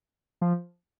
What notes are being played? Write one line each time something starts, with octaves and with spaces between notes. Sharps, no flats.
F3